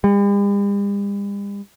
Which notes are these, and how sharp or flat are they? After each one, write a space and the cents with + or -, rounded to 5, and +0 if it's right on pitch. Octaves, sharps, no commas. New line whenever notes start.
G3 +45